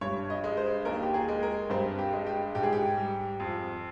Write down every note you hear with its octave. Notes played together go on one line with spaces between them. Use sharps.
G2 C#5
D#5
G#3
C5
D#2 A#4
G4
G#4
G#3
A#4
G2 C4
G4
G#3
G4
G#2 G4
G#4
G4
G3
F2